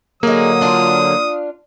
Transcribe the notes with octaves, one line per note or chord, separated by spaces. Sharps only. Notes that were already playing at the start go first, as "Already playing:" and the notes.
D3 F#3 A#3 D#4 G#4 D#6
D4 F4